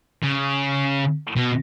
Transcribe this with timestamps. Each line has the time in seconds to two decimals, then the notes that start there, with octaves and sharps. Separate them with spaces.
0.23 C#3
1.36 B2